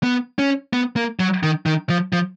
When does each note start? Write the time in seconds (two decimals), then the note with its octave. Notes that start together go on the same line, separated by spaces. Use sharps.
0.03 B3
0.39 C#4
0.73 B3
0.96 A#3
1.20 F#3
1.43 D#3
1.66 D#3
1.89 F3
2.13 F3